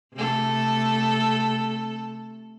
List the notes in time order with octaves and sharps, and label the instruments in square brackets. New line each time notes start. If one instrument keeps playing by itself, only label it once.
[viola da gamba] C3 A3 A4